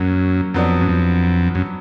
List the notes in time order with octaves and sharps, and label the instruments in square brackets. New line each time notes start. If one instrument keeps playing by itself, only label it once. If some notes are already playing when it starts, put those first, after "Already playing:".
Already playing: [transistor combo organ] F#2 [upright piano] F#3 A#3 C#4
[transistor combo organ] F2 [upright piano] F#3 B3 D4
[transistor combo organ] F#2
F2
F#2